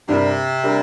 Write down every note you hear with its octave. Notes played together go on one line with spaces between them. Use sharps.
G2 C3 G3 D4 A#4
G3 D4 A#4